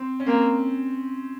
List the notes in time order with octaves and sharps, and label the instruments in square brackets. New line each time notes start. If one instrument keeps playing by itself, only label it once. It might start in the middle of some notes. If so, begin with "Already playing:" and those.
Already playing: [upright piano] C4
C#4
[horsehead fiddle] A#3 [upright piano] C4